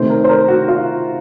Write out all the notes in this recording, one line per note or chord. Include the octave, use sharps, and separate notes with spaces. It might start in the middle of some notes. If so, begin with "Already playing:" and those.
Already playing: C3 D#3 A3 C5
A#4
C5
A#4
F#4
F4